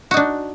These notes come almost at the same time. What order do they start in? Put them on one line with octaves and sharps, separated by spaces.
F#4 D#4 D4